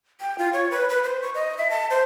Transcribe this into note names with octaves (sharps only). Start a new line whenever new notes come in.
G5
F4
C#5
B4
B4
C5
C#6
D#5
E5
A5
C5